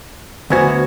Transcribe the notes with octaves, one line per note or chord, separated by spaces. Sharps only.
D2 B3 F#4 C5 G#5 G#6